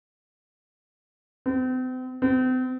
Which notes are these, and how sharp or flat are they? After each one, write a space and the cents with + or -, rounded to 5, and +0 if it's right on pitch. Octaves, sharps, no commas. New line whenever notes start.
C4 -40
C4 -40